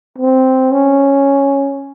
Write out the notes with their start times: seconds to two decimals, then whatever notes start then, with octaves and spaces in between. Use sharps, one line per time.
0.18 C4
0.72 C#4